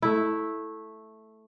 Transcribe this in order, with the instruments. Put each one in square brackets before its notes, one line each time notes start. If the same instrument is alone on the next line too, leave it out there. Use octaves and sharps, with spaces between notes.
[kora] A3 E4